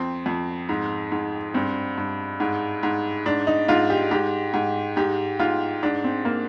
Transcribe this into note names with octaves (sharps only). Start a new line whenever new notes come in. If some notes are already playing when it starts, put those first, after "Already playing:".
Already playing: F2 C4
F2
G#2
G#2
G2 C4
G2
G#2
G#2
G#2 D4
D#4
G#2 F4
G4
G#2 G4
G#2
G#2 G4
G#2 F4
G#2 D4
C4
A#3